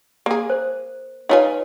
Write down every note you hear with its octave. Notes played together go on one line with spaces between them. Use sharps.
A#3 G#4
C5
D#4 F4 B4 C#5 F5 G#5